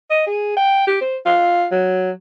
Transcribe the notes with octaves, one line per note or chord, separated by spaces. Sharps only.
D#5
G#4
G5
G4
C5
F4
F#3